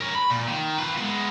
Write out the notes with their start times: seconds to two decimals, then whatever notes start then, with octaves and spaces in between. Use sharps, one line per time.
0.01 A#4 C#5
0.15 B5
0.30 A#2
0.48 D#3
0.78 F4 B4
0.98 G#3 B3